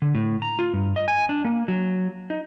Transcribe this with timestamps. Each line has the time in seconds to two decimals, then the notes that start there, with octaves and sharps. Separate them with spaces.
0.02 D3
0.15 A2
0.42 A#5
0.59 F4
0.73 G2
0.96 D#5
1.08 G#5
1.29 D4
1.45 A#3
1.68 F#3
2.30 D#4